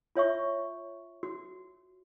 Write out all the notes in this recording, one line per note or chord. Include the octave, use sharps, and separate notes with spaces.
F4 C#5 E5 C#6
F#4